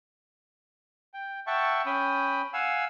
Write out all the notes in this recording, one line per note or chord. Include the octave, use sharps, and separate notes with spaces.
G5
E5 F#5 G5 A5 C#6
C#4 G5 B5 D#6
F5 F#5 G#5 E6